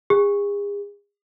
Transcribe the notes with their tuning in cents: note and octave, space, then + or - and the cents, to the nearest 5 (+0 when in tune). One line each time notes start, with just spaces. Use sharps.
G#4 -40